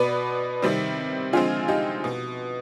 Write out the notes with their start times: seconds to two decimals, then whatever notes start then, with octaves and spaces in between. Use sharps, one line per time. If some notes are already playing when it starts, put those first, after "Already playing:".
Already playing: B2 B3 B4 D5
0.62 C3 D#3 G3 C4
1.33 D3 F3 G#3 C4 F4 G#4
1.68 D#4 G4
2.04 B2